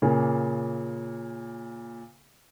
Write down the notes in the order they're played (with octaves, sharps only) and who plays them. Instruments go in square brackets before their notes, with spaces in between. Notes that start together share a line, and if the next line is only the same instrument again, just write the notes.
[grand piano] A#2 C#3 A#3